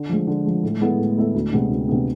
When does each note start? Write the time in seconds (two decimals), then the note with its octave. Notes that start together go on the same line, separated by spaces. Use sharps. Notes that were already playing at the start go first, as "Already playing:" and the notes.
Already playing: D3
0.09 F3 G#3
0.27 D3
0.45 F3 G#3
0.63 A2
0.81 G#3 B3 E4 A4
0.99 A2
1.17 G#3 B3 E4 A4
1.34 D2
1.52 C3 G#3 B3 D4
1.70 D2
1.88 C3 G#3 B3 D4